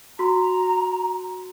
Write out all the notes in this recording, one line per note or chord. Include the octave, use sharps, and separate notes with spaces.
F#4 A#5 C6